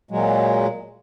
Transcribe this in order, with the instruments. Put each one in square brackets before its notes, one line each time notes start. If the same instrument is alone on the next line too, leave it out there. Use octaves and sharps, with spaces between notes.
[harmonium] A#2 F#3 G#3